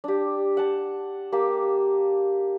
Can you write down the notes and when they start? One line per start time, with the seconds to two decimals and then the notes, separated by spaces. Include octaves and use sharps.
0.04 D4 G4
0.57 F#5 A5
1.32 A#3 G4 A5